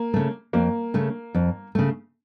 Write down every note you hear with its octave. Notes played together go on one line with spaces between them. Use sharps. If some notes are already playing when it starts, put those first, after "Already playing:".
Already playing: A#3
C#3 A3
F2 A#3
C#3 A3
F2
C#3 A3